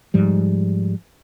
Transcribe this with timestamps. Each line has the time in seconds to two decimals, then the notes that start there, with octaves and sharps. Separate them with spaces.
0.14 G#2 F3 G3